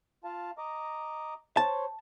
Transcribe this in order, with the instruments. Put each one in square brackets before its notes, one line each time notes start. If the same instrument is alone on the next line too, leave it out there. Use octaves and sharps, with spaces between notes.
[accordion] F4 F5 A5
D#5 A#5 D6
[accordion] C5 C#5 [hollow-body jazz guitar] A5